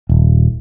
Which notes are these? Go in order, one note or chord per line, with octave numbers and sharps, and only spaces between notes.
D#1